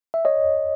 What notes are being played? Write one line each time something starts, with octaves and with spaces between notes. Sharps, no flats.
E5
C#5 D#5